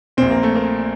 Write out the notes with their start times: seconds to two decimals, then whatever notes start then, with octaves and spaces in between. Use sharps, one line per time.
0.17 A#1 A#2 C4
0.30 A#3
0.43 A3
0.55 A#3